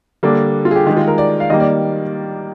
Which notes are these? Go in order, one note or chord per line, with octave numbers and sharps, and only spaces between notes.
D3 G3 A#3 D4
F4
G#4
G4
D#3 G#3 G4
F4
A#4
D5
F5
D#3 G3 A#3 D#5
D5